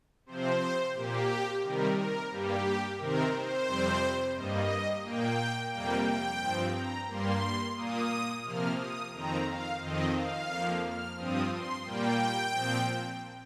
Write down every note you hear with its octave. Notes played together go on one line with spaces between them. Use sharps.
C3 F3 C4 C5
A#2 A#3 G4
C3 D#3 G3 A#4
A#4
G2 G3 A#3 G4
C3 D#3 C4 A#4
C5
F2 C3 G3 C4
G2 G3 A#3 D#5
A#2 A#3 G5
F2 C3 G3 A#3 G5
G5
G2 F3 C4
A#5
G2 G3 A#3 C6
A#2 A#3 D#6
C3 F3 A#3 F6
D#6
F2 D#3 C4 A#5
F5
F2 D#3 C4 D#5
F5
F2 F3 A#3
F6
G2 F3 C4 D#6
C6
A#2 G3 A#3 G5
A#2 F3 C4